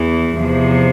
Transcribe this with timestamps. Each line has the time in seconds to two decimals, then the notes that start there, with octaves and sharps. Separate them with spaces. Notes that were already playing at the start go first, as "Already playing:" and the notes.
Already playing: E2 E3
0.39 E2 C3 F3